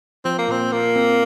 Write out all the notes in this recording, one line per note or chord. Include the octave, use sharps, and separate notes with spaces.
F3 C4
A#3
A#2 C4
A#3 F4
C4